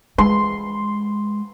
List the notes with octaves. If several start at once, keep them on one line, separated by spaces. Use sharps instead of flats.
G#3 C6